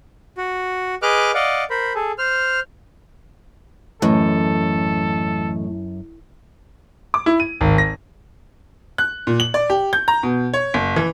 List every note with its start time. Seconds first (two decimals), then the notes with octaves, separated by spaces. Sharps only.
0.38 F#4
1.03 G#4 B4 D#5 D6 F6 F#6
1.35 D5 D#5 F5 F#5
1.70 A#4 C5 B5
1.95 G#4 A4
2.18 C5 F6
4.02 F#2 A2 E3 C#4 A4 D#5
7.14 D6
7.26 E4
7.40 D#7
7.61 G#1
7.78 A#6
8.98 F#6
9.27 A#2
9.40 F#7
9.54 D5
9.70 G4
9.93 G6
10.08 A#5
10.23 B2
10.54 C#5
10.74 F#1
10.96 E3